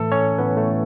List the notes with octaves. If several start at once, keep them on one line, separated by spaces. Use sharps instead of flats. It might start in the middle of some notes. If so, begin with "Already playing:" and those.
Already playing: A2 E3 A3 A4
C#4 C#5
A2 E3 B3 B4
A3